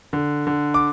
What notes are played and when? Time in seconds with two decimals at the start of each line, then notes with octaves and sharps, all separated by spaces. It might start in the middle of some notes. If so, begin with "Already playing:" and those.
0.13 D3
0.47 D3
0.74 D6